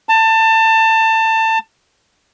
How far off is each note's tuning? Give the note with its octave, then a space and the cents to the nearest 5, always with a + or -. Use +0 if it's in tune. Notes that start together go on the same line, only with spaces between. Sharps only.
A5 +25